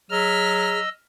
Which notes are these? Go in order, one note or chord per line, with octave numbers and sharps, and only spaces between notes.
F#3 G#4 D#5 E6 F6 B6